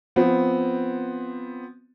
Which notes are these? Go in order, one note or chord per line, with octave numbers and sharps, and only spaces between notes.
F3 B3 C4